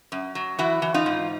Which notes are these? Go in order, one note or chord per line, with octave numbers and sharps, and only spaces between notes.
F#2
F#3
E3 E4 F#4
E3
D#4 F4
G#2